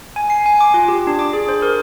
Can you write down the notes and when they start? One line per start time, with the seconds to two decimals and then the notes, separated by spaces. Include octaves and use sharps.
0.16 G#5
0.30 C7
0.46 G#5
0.61 D6
0.74 F4
0.88 G4
1.07 D4
1.19 D6
1.33 G#4
1.49 C5
1.62 A#4